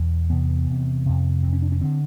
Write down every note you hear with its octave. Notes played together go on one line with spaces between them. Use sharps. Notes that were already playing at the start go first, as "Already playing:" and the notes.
Already playing: E2 B2
E2 C3 B3
E2 C3
F2 C3
F2 C3 C4
C#4
D4
C#4
D3 C4